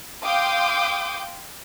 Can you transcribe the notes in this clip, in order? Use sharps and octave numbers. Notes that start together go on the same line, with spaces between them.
F5 G5 C6 D6 D#6 G6